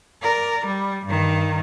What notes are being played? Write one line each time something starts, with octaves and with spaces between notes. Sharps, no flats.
A#4 D5
G3
G2 D#3